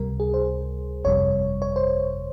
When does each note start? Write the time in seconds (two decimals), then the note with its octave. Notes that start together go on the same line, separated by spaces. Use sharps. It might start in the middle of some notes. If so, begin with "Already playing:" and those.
Already playing: C#2 C3 G3 A#4
0.20 G#4
0.34 C5
1.04 G1 F2 C3 G3 C#5
1.62 C#5
1.76 C5